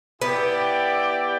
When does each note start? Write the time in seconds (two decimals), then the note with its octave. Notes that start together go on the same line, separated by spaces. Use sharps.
0.22 B3 E4 G4 D5 G5